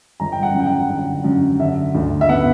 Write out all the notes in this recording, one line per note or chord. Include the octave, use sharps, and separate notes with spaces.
G1 A#5
G5
F#5
F#2
G5
F#5
D3
F#2
D3 E5
D2
E5
B3 F#5